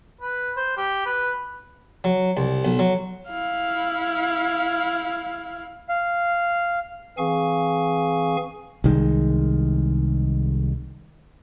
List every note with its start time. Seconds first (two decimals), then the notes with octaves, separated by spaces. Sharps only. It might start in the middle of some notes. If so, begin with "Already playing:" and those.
0.21 B4
0.57 C5
0.77 G4
1.06 B4
2.04 F#3
2.37 C2
2.65 B1
2.79 F#3
3.28 E4 F5
5.89 F5
7.18 E3 C4 G#4 F5 G#5 C#6
8.84 C2 D#3 G#3